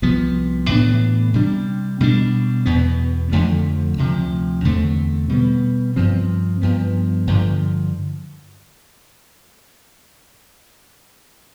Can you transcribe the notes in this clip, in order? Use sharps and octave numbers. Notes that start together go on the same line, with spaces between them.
C2 C3 F3 B3
A2 E3 B3 D4
C3 G3 D4
B2 G3 D4
E2 B2 B3
F2 D3 F3 A3
D2 C3 F3
E2 D3 A3 C4
B2 G3 B3
G2 F3 C4
G2 F3 B3
G2 D3 F3